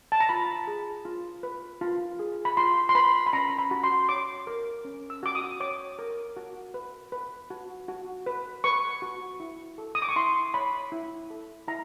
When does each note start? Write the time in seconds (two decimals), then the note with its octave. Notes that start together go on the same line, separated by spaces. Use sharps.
0.12 A5
0.20 A#5
0.29 F4 B5
0.67 G#4
1.05 F4
1.43 B4
1.81 F4
2.19 G#4
2.45 B5
2.57 F4 C6
2.89 C6
2.95 B4 B5
3.27 B5
3.33 C#4 A#5
3.59 B5
3.71 F#4
3.83 C6
4.09 C#5 D6
4.47 A#4
4.85 C#4
5.10 E6
5.23 F#4 D6
5.35 D#6
5.60 C#5 D6
5.99 A#4
6.37 F#4
6.74 B4
7.12 B4
7.50 F#4
7.88 F#4
8.26 B4
8.64 B4 C#6
9.02 F#4
9.40 E4
9.78 A4
9.95 D#6
10.02 D6
10.09 C#6
10.16 E4 C6
10.54 C#5 B5
10.92 E4
11.30 A4
11.68 E4 A#5